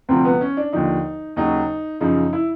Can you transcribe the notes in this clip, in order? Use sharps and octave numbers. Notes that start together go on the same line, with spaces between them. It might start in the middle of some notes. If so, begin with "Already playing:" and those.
D2 C3 F3 C4
B3
C#4
D4
D#2 D3 F3 D#4
D#2 C#3 F#3 D#4
F#2 C#3 F3 D#4
E4